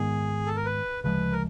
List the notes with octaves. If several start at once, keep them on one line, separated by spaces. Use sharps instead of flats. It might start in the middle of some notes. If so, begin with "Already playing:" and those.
Already playing: G#2 D#3 G#3 B3 G#4
A4
A#4
B4
D2 C#3 F3 G#3 B4
A#4